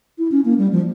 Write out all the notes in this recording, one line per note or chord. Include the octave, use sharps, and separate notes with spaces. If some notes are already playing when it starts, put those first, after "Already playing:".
E4
C#4
A#3
G3
F3